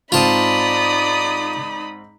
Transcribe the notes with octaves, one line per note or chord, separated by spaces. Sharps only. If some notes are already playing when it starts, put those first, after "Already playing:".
G#2 C4 D#4 F4 D5 A5 B5 D#6